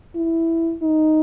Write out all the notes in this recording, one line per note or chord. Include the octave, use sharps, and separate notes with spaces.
E4
D#4